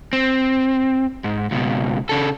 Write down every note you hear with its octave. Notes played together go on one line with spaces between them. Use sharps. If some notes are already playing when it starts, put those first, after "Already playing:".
C4
G#2
C#2 B2
C#3 A4